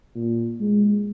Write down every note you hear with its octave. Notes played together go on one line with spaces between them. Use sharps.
A#2
G#3